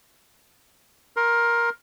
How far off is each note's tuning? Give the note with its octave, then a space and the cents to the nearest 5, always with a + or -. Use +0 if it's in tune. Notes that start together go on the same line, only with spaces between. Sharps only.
A#4 +10 C6 +25